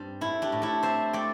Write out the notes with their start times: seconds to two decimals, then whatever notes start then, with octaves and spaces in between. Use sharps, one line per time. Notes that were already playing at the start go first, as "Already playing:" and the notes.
Already playing: G2 G3 C4
0.21 A2 E4
0.42 D4 G4
0.52 A2
0.62 E4 A4
0.83 C4 C5 E5
1.13 A3 D5 G5